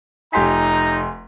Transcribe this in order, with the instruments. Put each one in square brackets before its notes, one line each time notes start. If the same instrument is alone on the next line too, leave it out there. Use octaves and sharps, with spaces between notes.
[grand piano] F1 G4 B6 [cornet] D#4 [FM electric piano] G#5 C6 G6 [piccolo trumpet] A#5